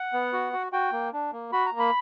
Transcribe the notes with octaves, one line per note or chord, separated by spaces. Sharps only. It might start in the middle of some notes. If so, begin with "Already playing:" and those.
Already playing: F#5
B3
F#4
F#4
F#4 G5
A#3
D4
A#3
F#4 B5
A#5
A#3
B5